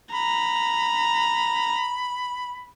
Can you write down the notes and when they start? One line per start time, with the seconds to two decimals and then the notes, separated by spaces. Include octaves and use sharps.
0.14 A#5 B5